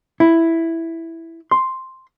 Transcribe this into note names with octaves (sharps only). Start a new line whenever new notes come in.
E4
C6